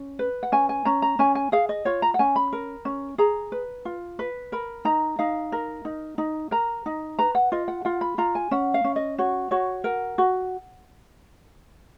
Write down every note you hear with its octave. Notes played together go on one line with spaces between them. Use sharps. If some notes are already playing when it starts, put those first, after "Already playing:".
Already playing: C#4
B4
F#5
C#4 G#5
G#5
C#4 A#5
A#5
C#4 G#5
G#5
G#4 F5
D#5
F4 C#5
A#5
F#5
C#4 G#5
B5
A#4
C#4
G#4 A#5
B4
F4
B4
A#4 B5
D#4 A#5
D#4 F5
A#4
D#4
D#4
A#4 A#5
D#4
B4 A#5
F#5
F4 D#5
F#5
F4 F#5
B5
F4 A#5
G#5
C#4 F#5
F5
C#4
D#5
F#4 C#5
F#4 C#5
A#4 F#5
F#4